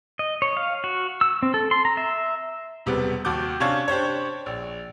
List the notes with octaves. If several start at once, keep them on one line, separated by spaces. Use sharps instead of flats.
D#5
C#5
F5
F#4
E6
C4
A4
C6
A#5
E5
E1 C3 G3 B3
D#2 F#4 A5 D6 G6
C3 C#4 D4 F5 C#6 G#6
D4 G4 C5 C#5
A#1